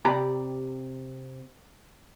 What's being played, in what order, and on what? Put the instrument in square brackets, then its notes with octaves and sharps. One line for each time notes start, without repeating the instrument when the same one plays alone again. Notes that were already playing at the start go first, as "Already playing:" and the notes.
[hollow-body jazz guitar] C3 G4 D5 A#5 B5